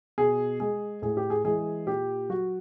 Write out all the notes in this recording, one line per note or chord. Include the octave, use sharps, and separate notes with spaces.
B2 G#4
G#3 G#4
A2 G#4
G4
G#4
E3 G#3 G#4
A#2 G4
F#3 F#4